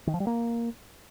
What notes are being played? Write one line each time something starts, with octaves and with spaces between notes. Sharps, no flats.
D#3
F3
G3
A#3